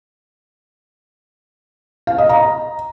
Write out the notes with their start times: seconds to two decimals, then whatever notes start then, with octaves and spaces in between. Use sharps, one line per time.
2.07 F5
2.18 D#5
2.29 A#5